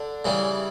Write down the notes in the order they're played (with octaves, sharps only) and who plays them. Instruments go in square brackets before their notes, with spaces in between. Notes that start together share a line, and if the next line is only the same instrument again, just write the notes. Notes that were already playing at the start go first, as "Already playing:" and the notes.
Already playing: [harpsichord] D3 D4
C#3 E3 G3